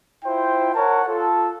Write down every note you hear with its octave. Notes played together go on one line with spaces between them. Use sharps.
E4 F4 C5 G5
A#4 C#5 F#5 A5
F4 A4